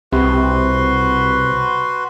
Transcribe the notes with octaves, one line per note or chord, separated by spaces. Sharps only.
C2 C3 F#4 B4 C6